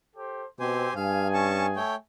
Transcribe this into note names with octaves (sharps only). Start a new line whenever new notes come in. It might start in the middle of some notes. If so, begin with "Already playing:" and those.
G4 A4 C5
B2 C4 G4 C5 G#5
G2 G#4 F5 G#5
C#4 A5 C#6
A3 C#5 G5